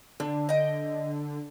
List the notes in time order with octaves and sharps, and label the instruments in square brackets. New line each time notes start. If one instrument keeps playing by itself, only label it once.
[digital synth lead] D3 [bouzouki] D4
[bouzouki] D#5 G5